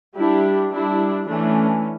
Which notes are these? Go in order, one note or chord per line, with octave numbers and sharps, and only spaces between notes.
G3 D4 E4 G4
G3 D4 E4
E3 A3 C#4 D4